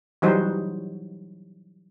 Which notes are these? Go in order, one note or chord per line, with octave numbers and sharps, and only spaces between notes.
E3 F#3 G3 D#4 F#4 C5